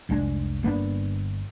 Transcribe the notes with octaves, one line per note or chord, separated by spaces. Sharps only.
F1 C2 G#3 D4
G1 A#3 B3 D4